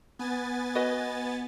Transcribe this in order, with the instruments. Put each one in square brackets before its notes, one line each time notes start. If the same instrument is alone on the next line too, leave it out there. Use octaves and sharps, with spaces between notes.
[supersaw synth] B3 G#5 A6
[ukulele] F#4 B4 D#5